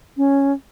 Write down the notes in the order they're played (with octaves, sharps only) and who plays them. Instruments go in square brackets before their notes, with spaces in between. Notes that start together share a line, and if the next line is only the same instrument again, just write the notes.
[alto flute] C#4